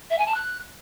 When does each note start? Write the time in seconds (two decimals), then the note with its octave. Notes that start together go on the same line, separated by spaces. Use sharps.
0.11 E5
0.19 G#5
0.27 A5
0.35 F#6